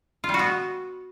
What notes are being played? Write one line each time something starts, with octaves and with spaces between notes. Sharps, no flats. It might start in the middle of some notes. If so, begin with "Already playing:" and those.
F4
G3
F#4
B3